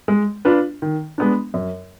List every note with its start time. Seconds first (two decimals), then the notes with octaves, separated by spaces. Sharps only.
0.08 G#3
0.45 D4 F4 B4
0.82 D#3
1.18 G#3 B3 D4
1.54 F#2